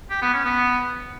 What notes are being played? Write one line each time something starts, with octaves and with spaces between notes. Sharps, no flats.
G4
B3
C#4
B3